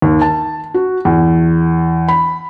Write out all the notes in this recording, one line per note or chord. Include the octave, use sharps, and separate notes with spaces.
D#2
A5
F#4
E2
B5